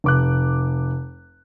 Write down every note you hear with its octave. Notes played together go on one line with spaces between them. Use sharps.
F1 D6 F#6